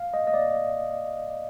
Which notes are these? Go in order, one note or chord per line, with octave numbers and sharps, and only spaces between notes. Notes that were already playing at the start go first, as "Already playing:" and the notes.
Already playing: F5
D#5
D#5
D5